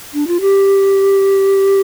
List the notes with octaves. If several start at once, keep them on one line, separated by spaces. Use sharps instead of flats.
D4
F4
G4